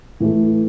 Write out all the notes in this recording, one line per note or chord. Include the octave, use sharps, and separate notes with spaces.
A2 E3 A3